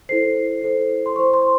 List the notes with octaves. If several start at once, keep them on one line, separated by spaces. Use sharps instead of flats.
E4 A4 C5 C7
E4 A4 C5
C6
E4 C5 C#6
C6